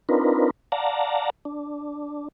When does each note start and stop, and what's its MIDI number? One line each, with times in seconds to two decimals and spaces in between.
0.09 0.50 60
0.09 0.50 62
0.09 0.50 63
0.09 0.50 65
0.09 0.50 70
0.09 0.50 71
0.72 1.30 74
0.72 1.30 77
0.72 1.30 78
0.72 1.30 81
0.72 1.30 82
1.45 2.28 62